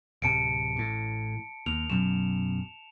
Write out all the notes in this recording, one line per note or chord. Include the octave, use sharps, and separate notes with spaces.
D1 C3 A5 C#7 D7
A1 A2
D#2 F7
B1 F#2 E7